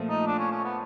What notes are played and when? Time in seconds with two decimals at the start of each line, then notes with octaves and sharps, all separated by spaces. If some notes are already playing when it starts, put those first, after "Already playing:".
Already playing: A#2 F3 A3
0.09 D#4
0.27 D4
0.39 C#4
0.51 C#4
0.64 B3